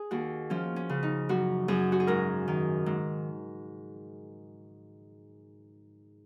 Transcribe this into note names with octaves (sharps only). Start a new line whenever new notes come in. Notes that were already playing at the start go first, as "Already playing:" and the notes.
Already playing: G#4
D#2 F#4
F3 C#4
C#4
C#3
D#4
F#2 F#4
F#2 G#4
F#4
G#4
G#2 A#4
D#3
G#2